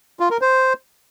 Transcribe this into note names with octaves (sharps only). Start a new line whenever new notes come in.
F4
A#4
C5